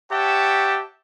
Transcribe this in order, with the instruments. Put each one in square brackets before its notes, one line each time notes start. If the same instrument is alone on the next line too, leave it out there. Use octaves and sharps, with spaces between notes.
[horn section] G4 C#5 E5 F#5 G5 A5